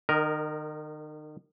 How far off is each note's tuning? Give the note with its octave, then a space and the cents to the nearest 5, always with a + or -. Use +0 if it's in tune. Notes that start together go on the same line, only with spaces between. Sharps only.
D#3 -35 A#4 +0 D#5 +0